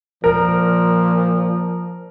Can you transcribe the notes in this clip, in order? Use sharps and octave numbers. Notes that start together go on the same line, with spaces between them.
A#2 F3 A#4